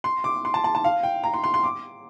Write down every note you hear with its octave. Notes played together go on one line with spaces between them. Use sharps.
C6
D6
C6
A5
A5
A5
F5
G5
A#5
C6
C6
C6
D6